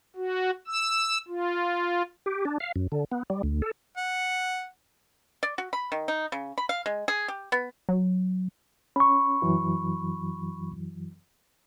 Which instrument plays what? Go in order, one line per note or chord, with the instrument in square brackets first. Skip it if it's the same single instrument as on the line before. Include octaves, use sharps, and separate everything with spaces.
[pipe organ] F#4
E6
F4
[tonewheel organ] G4
D4
F5
F#2
D3
B3
G3
D2
A4
[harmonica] F#5
[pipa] D5
F#4
B5
D#3
D#4
C#3
B5
F5
G#3
G#4
G4
B3
[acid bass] F#3
[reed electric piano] C#4 [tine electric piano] B5 C#6
[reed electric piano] F#2 E3 F#3